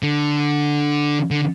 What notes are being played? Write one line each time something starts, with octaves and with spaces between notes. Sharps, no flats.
D3
D3